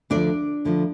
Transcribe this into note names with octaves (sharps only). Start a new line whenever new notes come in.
D2 D3 F3 D4 D5
D2 D3 F3